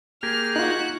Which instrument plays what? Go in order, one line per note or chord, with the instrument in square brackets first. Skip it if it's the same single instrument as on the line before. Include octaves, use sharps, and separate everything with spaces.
[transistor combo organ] A#3 G4 G#4 [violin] F6
[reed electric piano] D#4 F4 [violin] F#4 F#6